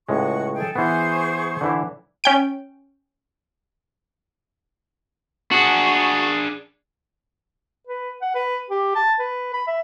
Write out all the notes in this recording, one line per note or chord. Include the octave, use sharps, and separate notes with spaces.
C#2 A2 G#3 F#4 C#6
G#4 A4 G5
E3 B3 G#4 C5 C#6
D3 E3 E4
C#4 G5 D7
D4 F#4 G#4
B4
F#5
B4
G4
A5
B4
B5
E5